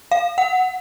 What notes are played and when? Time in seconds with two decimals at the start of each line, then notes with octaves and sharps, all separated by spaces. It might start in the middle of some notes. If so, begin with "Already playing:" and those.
0.11 F5
0.38 F#5